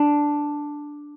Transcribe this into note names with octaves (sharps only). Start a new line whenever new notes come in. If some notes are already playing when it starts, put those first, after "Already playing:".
Already playing: D4